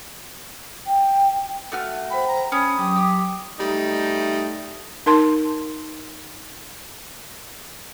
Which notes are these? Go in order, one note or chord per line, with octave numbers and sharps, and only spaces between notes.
G5
A3 F#4 F6
C5 G5 B5
A#5
C#4 B5 D#6
F#3 G4 G5 C#6
G4
G3 A3 D#4
D#4 A#4 A5 C6